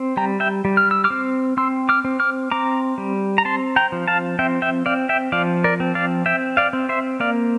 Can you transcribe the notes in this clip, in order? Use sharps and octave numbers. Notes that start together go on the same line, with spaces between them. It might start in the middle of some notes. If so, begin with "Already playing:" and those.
Already playing: C4
G3 G5 A#5
E5 G5
G3
F6
E6
D6 F6
C4
C4 C6 E6
D6 F6
C4
D6 F6
C4 A#5 D6
G3
A#5
C4 A5 C6
G5 A#5
F3
F5 A5
C4 E5 G5
E5 G5
C4 D5 F5
E5 G5
F3 D5 F5
A#4 D5
C4
D5 F5
C4 E5 G5
D5 F5
C4
C5 E5
A#3 D5 F5